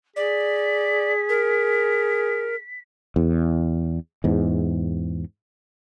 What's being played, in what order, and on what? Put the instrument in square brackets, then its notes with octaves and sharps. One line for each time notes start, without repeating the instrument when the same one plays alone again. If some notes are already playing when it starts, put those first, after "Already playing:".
[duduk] G#4 [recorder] D5 [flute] B6
[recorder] A#4
[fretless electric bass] E2
E2 G#2